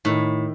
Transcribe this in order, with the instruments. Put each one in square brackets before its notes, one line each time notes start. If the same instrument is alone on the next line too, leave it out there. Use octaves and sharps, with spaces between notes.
[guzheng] A2 [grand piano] D#3